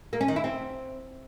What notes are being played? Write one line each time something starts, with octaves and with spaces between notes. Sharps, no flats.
A#3
C#4
D#3
E4
C4